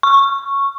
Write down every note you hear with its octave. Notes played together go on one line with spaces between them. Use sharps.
C#6